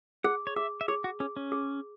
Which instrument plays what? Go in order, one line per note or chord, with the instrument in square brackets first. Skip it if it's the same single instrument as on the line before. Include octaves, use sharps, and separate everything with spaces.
[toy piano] G#4 [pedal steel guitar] F#5
[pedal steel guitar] C#5
[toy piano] G#4 [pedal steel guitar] E5
[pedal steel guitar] E5
[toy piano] G#4 [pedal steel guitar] C#5
[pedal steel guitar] F#4
[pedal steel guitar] C#4 [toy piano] G#4
[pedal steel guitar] C#4
[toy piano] G#4